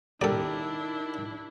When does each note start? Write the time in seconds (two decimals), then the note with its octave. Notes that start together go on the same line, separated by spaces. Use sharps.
0.21 D#3 D4 E4 G4 A4 A#4 D5